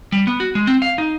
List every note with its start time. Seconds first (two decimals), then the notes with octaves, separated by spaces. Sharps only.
0.12 G3
0.27 B3
0.40 F#4
0.55 G#3
0.67 C4
0.82 F5
0.98 D#4